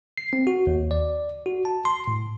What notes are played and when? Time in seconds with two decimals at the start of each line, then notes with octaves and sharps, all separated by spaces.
0.18 C7
0.33 C4
0.47 F#4
0.67 D#2
0.91 D5
1.46 F#4
1.65 A5
1.85 C6
2.08 A2